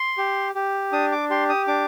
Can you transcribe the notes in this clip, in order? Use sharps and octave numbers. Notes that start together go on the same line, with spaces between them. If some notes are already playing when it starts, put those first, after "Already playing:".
Already playing: C6
G4
G4
D4 D#6
D6
G4 C6
D#6
D4 D6